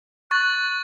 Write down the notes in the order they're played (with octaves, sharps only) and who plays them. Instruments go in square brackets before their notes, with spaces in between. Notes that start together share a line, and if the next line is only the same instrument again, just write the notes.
[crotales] C#6 A6 [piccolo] F#6